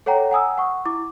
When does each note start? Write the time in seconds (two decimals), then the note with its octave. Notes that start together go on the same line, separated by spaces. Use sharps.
0.06 A4 C#5 F#5 G5 A#5
0.31 F#5 G#5 D#6 E6
0.58 F#5 C#6
0.85 E4 D6